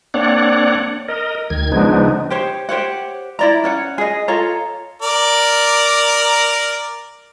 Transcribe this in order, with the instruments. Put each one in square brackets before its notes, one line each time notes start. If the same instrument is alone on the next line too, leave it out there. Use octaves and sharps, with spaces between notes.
[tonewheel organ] A#3 C4 D4 C#5 D5 F#5
A#4 D#5
D2 D#3 G#6
C#3 F3 G#3 B3 D4 D#4
[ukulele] G4 C5 C#5
G4 C5 C#5 F#5
E4 D5 A#5
C#4 C#5 F#5
G#4 D#5
F4 A4 C#5 A#5
[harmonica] A#4 D5